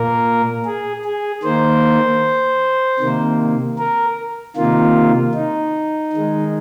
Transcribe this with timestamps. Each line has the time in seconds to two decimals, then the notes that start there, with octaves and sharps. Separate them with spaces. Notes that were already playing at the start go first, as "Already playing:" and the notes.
Already playing: A#2 A#3 A#4
0.66 G#4
1.05 G#4
1.43 D#3 A#3 C5
2.99 C3 D#3 A#3
3.78 A#4
4.56 C3 D#3 A#3 F4
5.35 D#4
6.13 D#3 G#3